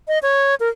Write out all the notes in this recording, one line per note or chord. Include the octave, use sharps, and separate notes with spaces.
D#5
C#5
A#4